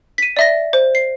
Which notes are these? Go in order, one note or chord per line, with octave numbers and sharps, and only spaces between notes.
B6 D#7
D5 E5 A#6
C5
C7